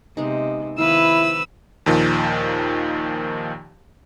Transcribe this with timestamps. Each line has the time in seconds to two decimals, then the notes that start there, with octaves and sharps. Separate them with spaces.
0.17 C3 G#3 B3 D#4
0.78 D#3 F3 B3 E4 F4 B4 E6
1.86 D#2 A#2 D#3 F3